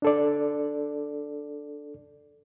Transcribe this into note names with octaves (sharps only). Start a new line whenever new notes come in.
D4 A4 D5